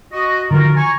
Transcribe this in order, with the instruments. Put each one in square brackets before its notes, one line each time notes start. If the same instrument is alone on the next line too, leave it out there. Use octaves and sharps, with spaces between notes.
[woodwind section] F#4 D#5
[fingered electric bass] D3 D#3 F3 [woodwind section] F4 F#4 A#4
[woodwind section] G#5 A#5 C#6